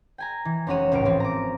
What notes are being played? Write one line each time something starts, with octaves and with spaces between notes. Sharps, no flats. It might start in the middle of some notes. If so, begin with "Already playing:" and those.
G5 G#5 A#5
E3
F1 G#3 C#4 F#4 C#5 D#7
G#1 C#2 A2 F6 D7
E3 F3 C4 F4
A#5 D6